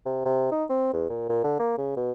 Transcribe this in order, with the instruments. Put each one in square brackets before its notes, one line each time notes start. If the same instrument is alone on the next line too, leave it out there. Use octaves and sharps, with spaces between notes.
[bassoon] C3
C3
D#4
C4
E2
A#2
A#2
D3
A#3
C#3
B2